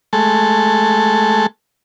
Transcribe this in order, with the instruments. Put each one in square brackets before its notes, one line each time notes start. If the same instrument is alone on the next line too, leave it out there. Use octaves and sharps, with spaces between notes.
[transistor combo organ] G#3 A3 A4